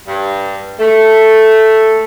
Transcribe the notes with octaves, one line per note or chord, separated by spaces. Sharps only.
G2
A3